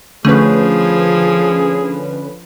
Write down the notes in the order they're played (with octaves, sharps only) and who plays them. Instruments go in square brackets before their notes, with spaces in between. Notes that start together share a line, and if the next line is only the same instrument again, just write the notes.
[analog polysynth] D3 C#4 B4 [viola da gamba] F3 [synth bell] A3 [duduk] G#4